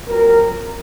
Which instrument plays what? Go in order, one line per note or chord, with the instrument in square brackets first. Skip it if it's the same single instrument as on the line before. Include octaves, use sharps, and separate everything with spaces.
[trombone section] A#2 F#3 C4 A#4